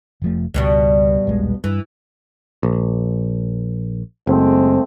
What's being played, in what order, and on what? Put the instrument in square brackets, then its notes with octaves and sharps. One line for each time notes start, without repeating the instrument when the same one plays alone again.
[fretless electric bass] F1 F3 A3
[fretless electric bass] C#2 [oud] G2 B2 G3
[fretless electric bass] D#1 A#1 G#3
[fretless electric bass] G2 [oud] E3
[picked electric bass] A#1
[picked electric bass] F#1 [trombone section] G#3 A3 C4